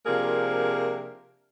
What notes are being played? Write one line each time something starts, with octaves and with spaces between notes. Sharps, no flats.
C3 F3 A#3 D4 G#4 A#4